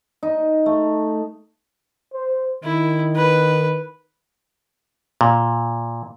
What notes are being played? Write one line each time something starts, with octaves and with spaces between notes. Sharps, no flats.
D#4
A3
C5
D#3 E4
B4
A#2